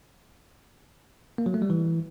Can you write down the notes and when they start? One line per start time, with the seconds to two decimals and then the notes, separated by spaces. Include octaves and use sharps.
1.38 A#3
1.46 F#3
1.54 A3
1.62 G3
1.70 E3